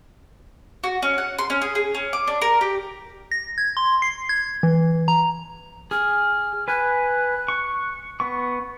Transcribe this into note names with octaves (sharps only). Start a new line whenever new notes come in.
F#4
C#4
F#5
C6
C#4
G#4
G#4
C#4
D6
D4
A#4
G4
A#6
G#6
C6
C7
G#6
E3
A#5
G#4 F6
B4 G#5 F#6
C#6
B3 C#6